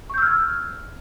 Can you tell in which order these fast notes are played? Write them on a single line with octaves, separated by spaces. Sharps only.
C#6 G6 E6 F6 G#6